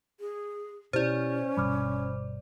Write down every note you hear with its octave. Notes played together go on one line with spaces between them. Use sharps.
G#4
B2 C#4 E4 G4 C5 D5 A6
G1 B2 G3 B5 D6 F6